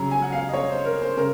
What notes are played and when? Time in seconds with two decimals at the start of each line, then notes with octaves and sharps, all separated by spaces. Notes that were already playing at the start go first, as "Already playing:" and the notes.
Already playing: C#3 F#3 A#5
0.11 G#5
0.22 F#5
0.32 F5
0.49 D#5
0.53 C#5
0.70 C5
0.85 A#4
1.02 C5
1.17 C#3 A#4